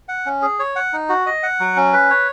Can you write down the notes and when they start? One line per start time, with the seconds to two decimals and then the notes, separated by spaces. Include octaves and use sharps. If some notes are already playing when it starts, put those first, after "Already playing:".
0.09 F#5
0.26 C#4
0.42 G#4
0.59 C#5
0.76 F#5
0.93 D#4
1.09 F#4
1.26 D#5
1.43 F#5
1.60 F#3
1.76 C#4
1.93 B4
2.10 C#5